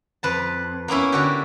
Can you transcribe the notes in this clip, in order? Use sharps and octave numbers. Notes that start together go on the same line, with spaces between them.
F2 B4 A5
A#3 B3 C#4 E4
D3 F#4 G4